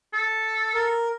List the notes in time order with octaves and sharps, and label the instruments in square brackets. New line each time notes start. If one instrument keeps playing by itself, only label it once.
[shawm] A4
[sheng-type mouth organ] A#4